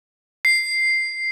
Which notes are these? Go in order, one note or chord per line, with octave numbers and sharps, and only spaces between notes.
C7